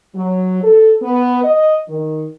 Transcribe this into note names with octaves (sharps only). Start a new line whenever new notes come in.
F#3
A4
B3
D#5
D#3